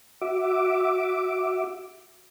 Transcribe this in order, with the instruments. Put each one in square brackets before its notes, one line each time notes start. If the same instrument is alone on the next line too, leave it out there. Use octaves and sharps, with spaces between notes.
[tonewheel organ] F#4 E5 D6